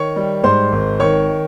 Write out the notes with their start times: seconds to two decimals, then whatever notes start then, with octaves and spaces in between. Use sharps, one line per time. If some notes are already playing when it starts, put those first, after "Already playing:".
Already playing: D#3 C#5 C#6
0.16 G3
0.44 G#2 C5 C6
0.72 G#1
1.00 D#3 C#5 C#6